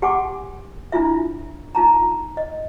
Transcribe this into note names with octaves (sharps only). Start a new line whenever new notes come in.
G4 F#5 G#5 C6 D6
D4 E4 F4 E5
D#4 F4 A5 A#5
D#5